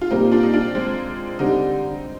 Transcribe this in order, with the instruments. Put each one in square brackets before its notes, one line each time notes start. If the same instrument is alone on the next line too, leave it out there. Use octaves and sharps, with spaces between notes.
[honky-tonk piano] F4
[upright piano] A#2 G3 A#3 [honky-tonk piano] C4 D#4
[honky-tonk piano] D4 F4
D#4
D4 F4
G#3 C4
[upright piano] D3 G3 D4 [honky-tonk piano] C4 D#4